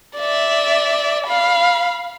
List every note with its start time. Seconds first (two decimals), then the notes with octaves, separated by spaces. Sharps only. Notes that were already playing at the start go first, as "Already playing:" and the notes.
0.17 D5 E5
1.27 F5 B5